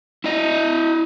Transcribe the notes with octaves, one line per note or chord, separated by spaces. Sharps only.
E4 D#5